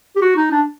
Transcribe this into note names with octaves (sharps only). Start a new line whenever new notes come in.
G4
F#4
D#4
D4